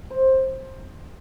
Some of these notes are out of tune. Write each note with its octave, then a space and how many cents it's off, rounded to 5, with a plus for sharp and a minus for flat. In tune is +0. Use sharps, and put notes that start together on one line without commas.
C5 +15